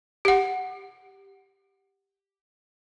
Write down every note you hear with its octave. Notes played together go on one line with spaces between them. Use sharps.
G4 F#5